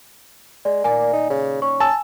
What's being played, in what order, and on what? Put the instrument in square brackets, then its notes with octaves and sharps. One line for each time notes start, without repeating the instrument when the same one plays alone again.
[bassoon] G#3 [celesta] D5
[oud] D#2 A#2 D5 [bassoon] A#3 [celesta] G#5
[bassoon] D#4
C#3
[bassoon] C#4 [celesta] C#6
[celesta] G#5 [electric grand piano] A5 E6